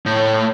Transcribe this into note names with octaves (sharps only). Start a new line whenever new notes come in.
A2